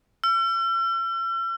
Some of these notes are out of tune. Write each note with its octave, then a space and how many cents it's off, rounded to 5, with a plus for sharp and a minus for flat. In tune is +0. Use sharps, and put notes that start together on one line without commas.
E6 +45